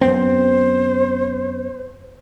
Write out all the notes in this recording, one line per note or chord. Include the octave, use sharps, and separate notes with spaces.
F#2 B3 C4 C5